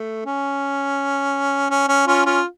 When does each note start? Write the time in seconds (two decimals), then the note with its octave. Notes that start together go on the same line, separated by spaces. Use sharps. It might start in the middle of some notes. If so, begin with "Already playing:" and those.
Already playing: A3
0.25 C#4
1.70 C#4
1.88 C#4
2.06 C#4 F4
2.25 C#4 F4